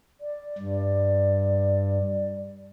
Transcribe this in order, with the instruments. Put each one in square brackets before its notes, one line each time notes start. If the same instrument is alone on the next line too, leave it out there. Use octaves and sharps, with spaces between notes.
[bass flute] D5
[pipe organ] G2